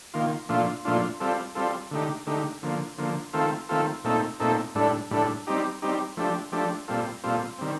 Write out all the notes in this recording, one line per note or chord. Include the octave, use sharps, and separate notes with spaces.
D#3 A#3 F4
A#2 F3 A3 D4 F4
A#2 F3 A3 D4 F4
G3 C4 F4 A4
G3 C4 F4 A4
D3 A3 D#4 G4
D3 A3 D#4 G4
D3 F3 A#3
D3 F3 A#3
D#3 A3 C4 F4 A4
D#3 A3 C4 F4 A4
A#2 A3 C4 D#4 A4
A#2 A3 C4 D#4 A4
A2 G3 D4 A4
A2 G3 D4 A4
G3 C4 D#4 G4
G3 C4 D#4 G4
F3 A3 D4 G4
F3 A3 D4 G4
A#2 G3 C4 F4 A4
A#2 G3 C4 F4 A4
D#3 G3 C4